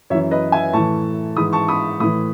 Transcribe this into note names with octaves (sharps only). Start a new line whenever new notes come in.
F#2 E3 C#5 E5
B4 D#5
E5 G#5
A2 E3 A5 C#6
G#2 E3 B5 D#6
A5 C#6
B5 D#6
A2 E3 B5 D#6